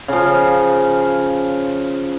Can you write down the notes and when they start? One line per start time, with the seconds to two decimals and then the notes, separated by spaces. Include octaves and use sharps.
0.08 C#3 F3